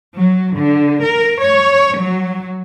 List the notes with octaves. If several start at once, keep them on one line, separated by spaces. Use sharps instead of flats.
F#3
D3
A#4
C#5
F#3